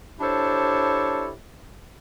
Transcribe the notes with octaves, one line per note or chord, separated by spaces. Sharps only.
D4 E4 G4 A4 C5 C#5